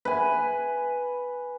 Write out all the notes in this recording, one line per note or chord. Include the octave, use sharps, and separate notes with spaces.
B4 G#5